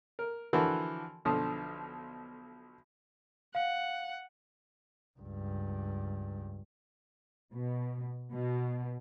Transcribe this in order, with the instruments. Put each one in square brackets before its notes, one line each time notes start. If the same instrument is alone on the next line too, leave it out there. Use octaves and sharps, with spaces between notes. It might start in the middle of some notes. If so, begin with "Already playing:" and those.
[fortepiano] A#4
D3 E3 F3 F#4 A#4
B1 D3 F3 D#6
[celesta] F5 [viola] F#5
[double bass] C#2 G2
[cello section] B2
B2